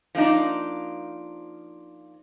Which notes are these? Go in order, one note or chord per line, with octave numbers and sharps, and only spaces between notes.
F3 A#3 D4 D#4